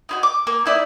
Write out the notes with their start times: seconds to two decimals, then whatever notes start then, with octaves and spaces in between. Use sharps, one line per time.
0.09 D#4 E4 F#4
0.23 D6
0.47 A#3
0.66 D#4 E4 D5